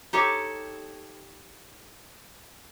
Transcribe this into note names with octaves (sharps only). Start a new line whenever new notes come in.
D#4 G4 A4 C#5